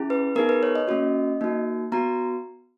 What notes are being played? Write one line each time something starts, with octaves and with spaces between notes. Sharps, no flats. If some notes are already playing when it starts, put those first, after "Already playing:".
Already playing: C#4 E4 G#4
B4
B3 D#4 G#4 A#4
B4
C#5
D#5
A#3 C#4 F#4 D#5
A#3 D#4 F#4
B3 F#4 A#5